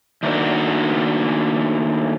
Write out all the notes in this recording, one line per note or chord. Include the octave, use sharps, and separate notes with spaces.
D#3 A3 A#3 D4 F#4